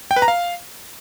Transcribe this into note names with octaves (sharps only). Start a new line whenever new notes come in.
G5
B4
A#5
F5